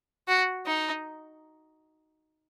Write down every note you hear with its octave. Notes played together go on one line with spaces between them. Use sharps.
F#4
D#4